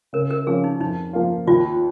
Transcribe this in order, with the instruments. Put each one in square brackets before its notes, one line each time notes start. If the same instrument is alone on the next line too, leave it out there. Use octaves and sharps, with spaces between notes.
[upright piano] C#3 [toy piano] A#4
[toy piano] A#4
[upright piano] F3 C#4 F4 [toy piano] G#4
[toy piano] D#4
[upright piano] F2 [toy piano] D#4
[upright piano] F3 A#3 F4
[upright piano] D#2 [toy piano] F4